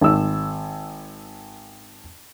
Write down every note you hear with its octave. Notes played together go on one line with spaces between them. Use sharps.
G#1 E6